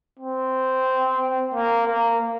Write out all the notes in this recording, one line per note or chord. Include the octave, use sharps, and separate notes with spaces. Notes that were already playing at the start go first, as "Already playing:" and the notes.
C4
A#3
A#3